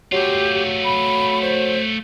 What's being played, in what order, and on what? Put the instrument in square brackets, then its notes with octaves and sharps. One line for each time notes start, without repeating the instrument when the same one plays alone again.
[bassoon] F#3 [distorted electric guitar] A3 F4 [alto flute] G4
[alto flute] B5
C5